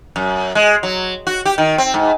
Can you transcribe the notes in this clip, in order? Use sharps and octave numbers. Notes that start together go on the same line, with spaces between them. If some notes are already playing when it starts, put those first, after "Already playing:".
F#2
G#3
F#3
F#4
G4
D#3
C4
G#2